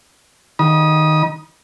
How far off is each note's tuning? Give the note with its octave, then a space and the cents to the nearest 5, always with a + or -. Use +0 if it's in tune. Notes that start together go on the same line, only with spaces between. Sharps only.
D#3 +0 B5 -45 D#6 +0